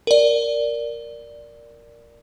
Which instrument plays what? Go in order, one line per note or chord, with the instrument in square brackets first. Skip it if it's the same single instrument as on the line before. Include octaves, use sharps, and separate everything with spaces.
[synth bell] A#4 D5